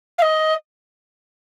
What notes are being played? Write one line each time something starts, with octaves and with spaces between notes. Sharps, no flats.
F5
D#5